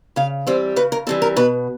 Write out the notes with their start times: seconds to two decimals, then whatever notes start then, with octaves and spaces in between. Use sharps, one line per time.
0.16 C#3 F5
0.47 E3 G3 C4 C5
0.76 C#3 B4
0.92 A#4
1.07 E3 G3 C4 A4
1.22 A#4
1.36 B2 B4